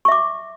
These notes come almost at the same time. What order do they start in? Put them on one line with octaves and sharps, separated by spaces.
C#6 E5 D6